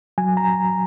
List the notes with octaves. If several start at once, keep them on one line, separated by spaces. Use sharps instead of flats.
F#3 G#5
A#5